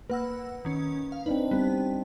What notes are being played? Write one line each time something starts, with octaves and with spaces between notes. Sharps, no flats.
A#3 B4 F#5 E6
D#3 C#4
F5
C4 D4 D#4 B4
G3 B3 C4